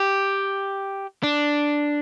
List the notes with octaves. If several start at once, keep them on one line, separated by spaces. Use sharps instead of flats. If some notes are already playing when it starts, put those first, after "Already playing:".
Already playing: G4
D4